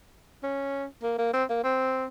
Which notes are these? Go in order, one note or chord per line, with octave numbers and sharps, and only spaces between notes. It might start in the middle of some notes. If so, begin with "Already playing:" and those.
C#4
A#3
A#3
C4
A#3
C4